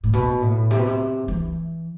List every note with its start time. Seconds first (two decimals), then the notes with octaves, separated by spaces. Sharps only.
0.04 A2
0.13 B2
0.42 A2
0.70 C3
0.78 B2
0.86 C3
1.28 E3